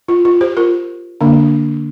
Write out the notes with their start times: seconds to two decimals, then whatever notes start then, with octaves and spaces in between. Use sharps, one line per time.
0.08 F4
0.25 F4
0.41 G4 C5
0.57 F4 A#4
1.21 D3 A#3 D4